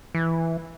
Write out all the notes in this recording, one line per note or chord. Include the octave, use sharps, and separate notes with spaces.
E3